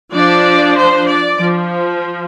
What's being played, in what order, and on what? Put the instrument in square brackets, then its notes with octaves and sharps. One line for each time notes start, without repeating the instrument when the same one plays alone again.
[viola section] F3 D4 D5
C5
D5
F3